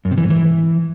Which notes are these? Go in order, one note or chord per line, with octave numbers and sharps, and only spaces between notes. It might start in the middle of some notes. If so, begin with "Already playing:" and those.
F#2
C3
E3
G#2
E3